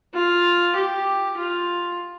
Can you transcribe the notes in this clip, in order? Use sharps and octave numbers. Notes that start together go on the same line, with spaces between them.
F4
G4
F4